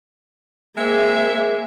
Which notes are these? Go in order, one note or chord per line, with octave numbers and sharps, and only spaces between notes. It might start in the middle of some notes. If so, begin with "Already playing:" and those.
G#3 A#3 C4 G#4 E5